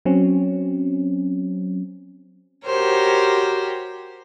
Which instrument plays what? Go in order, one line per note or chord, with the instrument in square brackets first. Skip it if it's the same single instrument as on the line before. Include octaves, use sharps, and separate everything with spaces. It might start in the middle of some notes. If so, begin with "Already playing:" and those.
[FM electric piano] F#3 C4 C#4
[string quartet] F#4 G4 A#4 C5 C#5